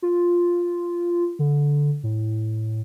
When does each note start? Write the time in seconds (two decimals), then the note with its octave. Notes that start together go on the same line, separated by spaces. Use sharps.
0.02 F4
1.39 D3
2.03 A2